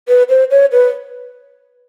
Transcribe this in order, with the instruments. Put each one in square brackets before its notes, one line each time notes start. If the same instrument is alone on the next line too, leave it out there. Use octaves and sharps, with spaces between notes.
[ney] B4
C5
C#5
B4